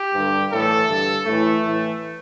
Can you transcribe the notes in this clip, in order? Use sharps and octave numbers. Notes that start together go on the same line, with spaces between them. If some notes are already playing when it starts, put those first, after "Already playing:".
Already playing: G4
G2 D3
A2 E3 A4
G2 D3
A2 E3 A3
A2 E3